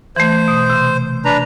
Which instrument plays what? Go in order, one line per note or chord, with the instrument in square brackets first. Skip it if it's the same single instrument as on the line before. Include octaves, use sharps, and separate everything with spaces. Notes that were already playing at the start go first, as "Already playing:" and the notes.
[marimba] E3 A3 [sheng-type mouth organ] C5
[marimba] B2
C3
[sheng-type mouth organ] D4 B4 A#5